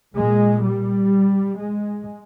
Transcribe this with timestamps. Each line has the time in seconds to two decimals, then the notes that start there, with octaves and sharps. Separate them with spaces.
0.17 A#2 G#3
0.65 G3
1.59 G#3